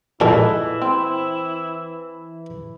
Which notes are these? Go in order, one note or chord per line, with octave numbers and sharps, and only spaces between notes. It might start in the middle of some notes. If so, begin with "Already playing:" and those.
A#2 D#3 E3 G#3 E4 A4
C4